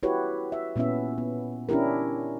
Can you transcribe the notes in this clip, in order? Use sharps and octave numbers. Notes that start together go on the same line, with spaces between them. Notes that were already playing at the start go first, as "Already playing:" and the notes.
E4 F#4 G4 B4 C#5
E5
A#2 B3 C#4 E4 E5
B3
C#4 D4 E4 G4 A#4